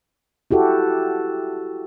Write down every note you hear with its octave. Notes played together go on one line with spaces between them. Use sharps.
E4 F#4 G4 A4